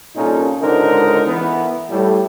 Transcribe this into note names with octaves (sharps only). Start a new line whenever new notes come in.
C2 A#2 C#4 D#4 A4 A#4
C#2 G#2 D3 D#4 A#4 C5
E3 B3
A2 G3 A4